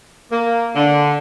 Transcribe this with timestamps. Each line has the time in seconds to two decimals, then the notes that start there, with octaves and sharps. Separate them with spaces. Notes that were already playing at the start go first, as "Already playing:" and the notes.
0.31 A#3
0.76 D3